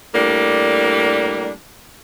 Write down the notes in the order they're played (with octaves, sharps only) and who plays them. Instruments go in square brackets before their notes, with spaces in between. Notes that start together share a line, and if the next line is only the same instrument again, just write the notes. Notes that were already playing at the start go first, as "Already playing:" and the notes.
[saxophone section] A2 G3 A#3 D4